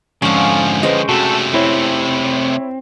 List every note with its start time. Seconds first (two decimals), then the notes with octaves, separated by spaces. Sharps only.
0.22 F2 G#2 D3 F3 C#4 F5
0.83 G#3 C#4 B4 C5 D#5 G5
1.09 C3 A3 F#4 A4
1.54 C4 E4 C#5